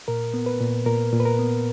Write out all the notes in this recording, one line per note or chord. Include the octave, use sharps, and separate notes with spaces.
A#2 A#4
B3
B4
A#2
A#2 A#4
A#2
B4
A#4
B3